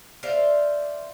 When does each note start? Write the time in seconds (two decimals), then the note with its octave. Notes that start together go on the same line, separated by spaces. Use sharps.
0.23 C5 D5 E5 F5